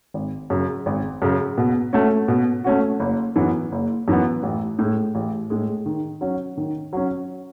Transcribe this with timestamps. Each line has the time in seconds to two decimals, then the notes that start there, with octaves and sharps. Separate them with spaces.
0.14 G#1
0.50 F#2 C#3
0.86 G#1
1.22 F#2 C#3
1.58 B2
1.93 A3 C#4 F#4
2.28 B2
2.64 A3 C#4 F#4
3.00 F#1
3.36 F#2 E3 B3
3.72 F#1
4.08 F#2 E3 B3
4.43 A1
4.79 A2 G#3
5.15 A1
5.50 A2 G#3
5.86 D#3
6.21 F#3 C#4
6.57 D#3
6.93 F#3 C#4